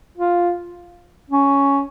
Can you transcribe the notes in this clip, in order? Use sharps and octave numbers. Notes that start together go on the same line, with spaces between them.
F4
C#4